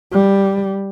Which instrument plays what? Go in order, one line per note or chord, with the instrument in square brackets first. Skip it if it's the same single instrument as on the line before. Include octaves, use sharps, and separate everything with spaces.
[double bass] G3